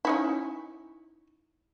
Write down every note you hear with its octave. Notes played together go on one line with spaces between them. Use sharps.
C#4 D#4 E4